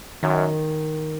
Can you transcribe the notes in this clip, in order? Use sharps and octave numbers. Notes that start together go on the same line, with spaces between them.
F#2 D#3